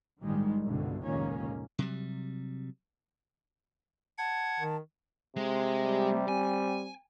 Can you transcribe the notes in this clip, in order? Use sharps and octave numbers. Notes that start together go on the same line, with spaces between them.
A#1 G#2 D#3 G3 G#3
G1 C2 G2 B2 D3
F1 C#2 A#2 D#3 A#3 C#4
C3 F#3 G3
F#5 A5 G#6
D#3
C3 G#3
G3
C4 G#5